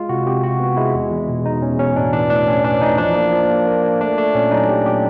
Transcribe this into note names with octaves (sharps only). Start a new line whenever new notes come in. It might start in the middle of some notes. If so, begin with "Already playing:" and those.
Already playing: G#3 F4
C3 F#4
C3 G4
C3 F#4
B3
G#3 E4
E2
E2
B2
B2 D#4
E2 C#4
B2 C#4
A2 D4
E3 D4
A2 D4
A2 C#4
E3 D4
A2 D#4
F3 D4
A#3
F3
A#3
A#3
A#3
A3 D4
A3 D4
A#2 C#4
F#3 D#4
F#3 G4
A#2 G4